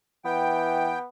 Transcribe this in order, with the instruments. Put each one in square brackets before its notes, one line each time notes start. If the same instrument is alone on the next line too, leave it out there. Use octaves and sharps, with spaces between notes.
[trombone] E3 [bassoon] B3 [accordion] G5